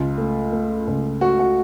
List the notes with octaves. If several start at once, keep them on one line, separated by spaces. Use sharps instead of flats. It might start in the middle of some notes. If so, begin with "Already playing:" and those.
Already playing: C#2 F4
A3
A3
C#2
A3 F#4
F#4